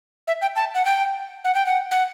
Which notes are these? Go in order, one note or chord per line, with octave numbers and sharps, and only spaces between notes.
E5
G5
A5
F#5
G5
F#5
G5
F#5
F#5